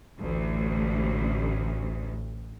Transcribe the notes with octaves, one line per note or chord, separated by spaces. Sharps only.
A1 D2